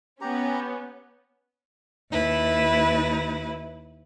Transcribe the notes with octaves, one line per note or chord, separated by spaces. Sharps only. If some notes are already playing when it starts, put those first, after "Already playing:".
B3 C#4 G4 A#5
D#2 E4 B4